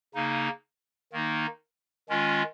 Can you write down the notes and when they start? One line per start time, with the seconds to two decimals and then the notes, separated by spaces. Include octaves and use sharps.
0.15 C#3 A#3 D#4
1.13 D#3 A#3 D#4
2.09 D#3 G#3 C#4 F4